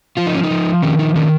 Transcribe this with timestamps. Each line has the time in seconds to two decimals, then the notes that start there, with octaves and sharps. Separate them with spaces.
0.17 F3 F4
0.26 D#4
0.35 C#4
0.43 D#4
0.51 F3
0.83 D#3 C#4
0.99 D#4
1.15 D#3 C#4